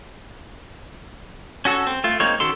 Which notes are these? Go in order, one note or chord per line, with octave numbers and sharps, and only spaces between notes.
C#4 F#4 A4
C4
A3 F4
G#3 A#3 C4 D#4 C#5
D#3 C#4 F#4 A4 C6